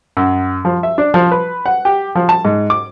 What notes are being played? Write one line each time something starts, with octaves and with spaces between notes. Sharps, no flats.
F#2
F3
E5
D4
F3
B4
F#5
G4
F3
A5
G#2
D6